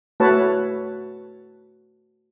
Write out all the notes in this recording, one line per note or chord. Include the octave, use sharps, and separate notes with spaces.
A3 F#4 B4 C#5 A5